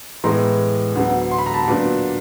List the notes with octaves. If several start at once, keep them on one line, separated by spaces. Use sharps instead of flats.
A2 E3 G#3 B3 A#5 C6
D2 D3 F#3 B3
C6
B5
A#5
A5 B5
A#2 F#3 B3 D4